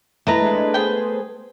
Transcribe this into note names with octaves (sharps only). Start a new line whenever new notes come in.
A3 E4 B4 D#5 A#5
G#3 D4
B3 G#4 C5 G5